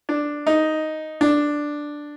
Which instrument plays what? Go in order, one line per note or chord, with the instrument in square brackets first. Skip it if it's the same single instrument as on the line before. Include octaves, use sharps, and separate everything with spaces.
[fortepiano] D4
D#4
D4